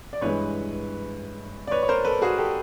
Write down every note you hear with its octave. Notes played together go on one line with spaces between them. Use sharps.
D5
G2 E3 G#3 B4 C#5
D5
B4 C#5
C#5
A#4 C5
A4 B4
F#4 G#4
G4 A4